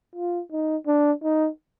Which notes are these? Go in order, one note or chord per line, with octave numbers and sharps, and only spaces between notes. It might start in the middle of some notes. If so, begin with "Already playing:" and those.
F4
D#4
D4
D#4